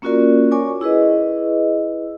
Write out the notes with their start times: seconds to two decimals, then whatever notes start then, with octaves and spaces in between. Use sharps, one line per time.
0.02 A#3 C#4 F4 F#4 A#4 D5
0.51 A#4 C#5 D5 G#5 C#6 D6
0.81 E4 G#4 B4 D#5